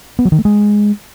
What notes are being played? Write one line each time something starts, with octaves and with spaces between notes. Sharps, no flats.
B3
F#3
D#3
A3
G#3